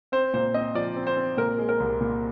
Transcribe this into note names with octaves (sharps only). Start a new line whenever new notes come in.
C4 C5
A#2 C5
C4 D#5
F3 D5
C4
C5
C4
A#2 A#4
G#3
A#4
C2
A#2